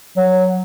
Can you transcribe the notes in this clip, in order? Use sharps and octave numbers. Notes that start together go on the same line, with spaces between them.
F#3